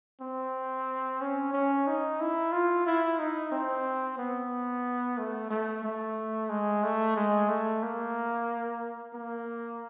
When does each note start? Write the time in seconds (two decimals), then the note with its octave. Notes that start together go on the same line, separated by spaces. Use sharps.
0.21 C4
1.21 C#4
1.53 C#4
1.87 D#4
2.20 E4
2.52 F4
2.86 E4
3.19 D#4
3.52 C4
4.18 B3
5.18 A3
5.50 A3
5.83 A3
6.49 G#3
6.83 A3
7.16 G#3
7.48 A3
7.82 A#3
9.14 A#3